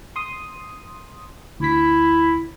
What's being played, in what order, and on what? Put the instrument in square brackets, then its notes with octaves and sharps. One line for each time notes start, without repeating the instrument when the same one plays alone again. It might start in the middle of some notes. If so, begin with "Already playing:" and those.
[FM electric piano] C6 D#6
[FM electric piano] D2 B6 [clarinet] E4